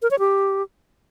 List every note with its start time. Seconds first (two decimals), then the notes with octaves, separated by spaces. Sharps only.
0.02 A#4
0.11 C#5
0.19 G4